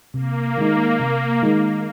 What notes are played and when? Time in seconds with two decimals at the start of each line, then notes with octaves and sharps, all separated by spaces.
0.14 C3 A#3
0.57 D#3 G#3 D#4
1.00 C3
1.43 D#3 G#3 D#4